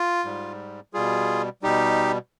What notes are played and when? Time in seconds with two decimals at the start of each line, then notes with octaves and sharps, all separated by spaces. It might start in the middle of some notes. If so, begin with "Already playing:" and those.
Already playing: F4
0.25 G#2 G3
0.94 B2 G3 F4 G#4
1.62 B2 G3 D#4 G4